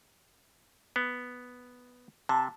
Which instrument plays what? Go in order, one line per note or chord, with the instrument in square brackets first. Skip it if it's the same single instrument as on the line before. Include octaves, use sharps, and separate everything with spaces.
[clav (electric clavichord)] B3
[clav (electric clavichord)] C3 [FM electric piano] A5